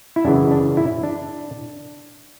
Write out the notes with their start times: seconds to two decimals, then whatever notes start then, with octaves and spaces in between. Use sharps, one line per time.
0.16 E4
0.25 F#2 C#3 E3 D4
0.51 D4
0.77 E4
1.03 D4